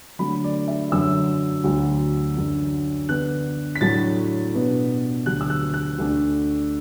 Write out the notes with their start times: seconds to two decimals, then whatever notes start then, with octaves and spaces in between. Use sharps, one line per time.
0.19 D3 F#3 A3 D4 B5
0.44 D5
0.68 E5
0.92 F#2 D3 F#3 E6
1.64 D2 D3 F#3
2.37 F#2 D3 F#3 D4
3.09 D3 B3 D4 F#6
3.76 B6
3.81 A2 F#3 A3 D4 A6
4.54 B2 B3 D4
5.26 D2 D3 F#3 F#6
5.41 E6
5.50 F#6
5.74 F#6
5.98 D2 D3 A3 D4